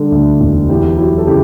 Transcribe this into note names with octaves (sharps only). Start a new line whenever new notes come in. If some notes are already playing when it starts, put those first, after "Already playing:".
Already playing: D3 G3 D4
D2
E1
E2 E4 G4
F#3 E4 G4
A4
C#3 E4 G4